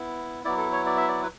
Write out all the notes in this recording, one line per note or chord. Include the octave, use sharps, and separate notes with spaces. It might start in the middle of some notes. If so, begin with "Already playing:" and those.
Already playing: B3 E4
F#3 B3 E4 D5
A4
C#5
D5
E5
D5
B4